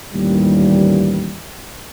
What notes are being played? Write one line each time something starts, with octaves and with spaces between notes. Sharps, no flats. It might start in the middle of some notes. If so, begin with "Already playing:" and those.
A1 D#2 A#2 E3 G3